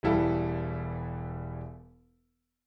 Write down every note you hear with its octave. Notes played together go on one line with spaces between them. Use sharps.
E1 E3 G3 E4 A4 F5